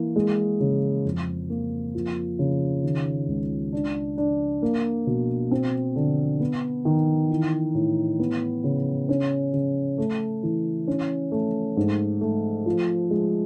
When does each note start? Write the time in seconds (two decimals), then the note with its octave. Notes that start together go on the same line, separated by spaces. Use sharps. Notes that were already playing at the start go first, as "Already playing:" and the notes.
Already playing: E3 A#3
0.16 G#3
0.60 C#3
1.05 F2
1.50 A#3
1.95 F3
2.39 C#3
2.83 D#3
3.28 C#2
3.73 D4
4.18 D4
4.62 A#3
5.07 B2
5.51 C4
5.96 D3
6.40 B3
6.85 D#3
7.30 E3
7.75 A2
8.19 B3
8.64 C#3
9.09 C#4
9.53 C#3
9.98 A3
10.43 E3
10.88 C#4
11.32 A3
11.77 G#2
12.21 A3
12.66 F3
13.11 G#3